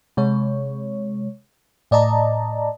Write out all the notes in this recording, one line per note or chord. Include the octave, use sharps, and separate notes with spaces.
C3 G#3 C#5
A2 D5 D#5 A5 A#5